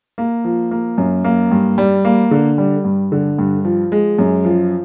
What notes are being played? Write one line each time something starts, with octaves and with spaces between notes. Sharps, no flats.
A#3
F3
A#3
F#2
A#3
G2
G3
A#3
D3
G3
G2
D3
G2
F3
G#3
F#2
F3